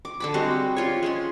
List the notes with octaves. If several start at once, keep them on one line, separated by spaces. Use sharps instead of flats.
D6
D3 A5 B5
G3 G#3 C4 F#4
C#4 F4 C#5
G#3 C#4 C6